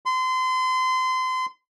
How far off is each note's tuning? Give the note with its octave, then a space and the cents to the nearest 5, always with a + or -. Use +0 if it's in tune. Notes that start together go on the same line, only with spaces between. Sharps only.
C6 -30